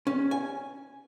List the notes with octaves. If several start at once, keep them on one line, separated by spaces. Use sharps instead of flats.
C#4
G#5